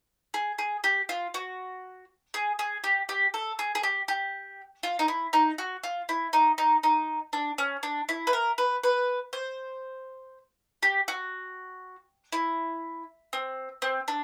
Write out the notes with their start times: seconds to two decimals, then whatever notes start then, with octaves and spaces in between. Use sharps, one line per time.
0.34 G#4
0.59 G#4
0.84 G4
1.09 F4
1.34 F#4
2.34 G#4
2.59 G#4
2.84 G4
3.09 G4
3.34 A4
3.59 G#4
3.75 G#4
3.83 G4
4.08 G4
4.83 F4
4.99 D#4
5.08 E4
5.33 D#4
5.58 F#4
5.84 F4
6.09 E4
6.33 D#4
6.58 D#4
6.83 D#4
7.33 D4
7.58 C#4
7.83 D4
8.09 E4
8.27 B4
8.33 A#4
8.58 B4
8.83 B4
9.33 C5
10.83 G4
11.08 F#4
12.33 E4
13.33 C4
13.82 C4
14.08 D4